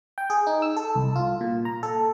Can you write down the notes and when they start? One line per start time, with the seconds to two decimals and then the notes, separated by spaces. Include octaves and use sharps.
0.18 G5
0.30 G#4
0.47 D#4
0.62 E6
0.77 A4
0.95 C2
1.16 F4
1.41 A#2
1.65 A#5
1.83 A4